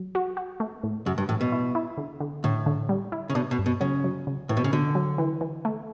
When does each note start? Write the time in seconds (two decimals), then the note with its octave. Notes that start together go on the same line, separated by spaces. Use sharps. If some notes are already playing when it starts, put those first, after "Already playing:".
Already playing: F#3
0.15 F#4
0.37 F#4
0.60 A3
0.83 A2
1.06 F#2 C#3
1.18 G2
1.29 A2 E3
1.41 B2
1.52 E4
1.75 E4
1.97 D3
2.20 D3
2.44 A2 D3
2.66 D3
2.89 G3
3.12 E4
3.30 C#3
3.35 B2 D4
3.51 B2
3.58 G2
3.66 B2
3.81 C#3 F#3
4.04 F#3
4.27 C#3
4.49 A2 E3
4.57 B2
4.64 C#3
4.73 B2 D3
4.95 F#3
5.18 E3
5.41 E3
5.65 A3